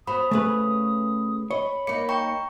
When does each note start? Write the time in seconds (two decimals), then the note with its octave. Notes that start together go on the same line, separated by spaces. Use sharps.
0.07 B3 F#4 C5 B5 D#6
0.31 C#3 A3 G#4 B4
1.51 C#5 D#5 B5
1.87 A#3 D#4 C#7
2.09 G5 A#5 C#6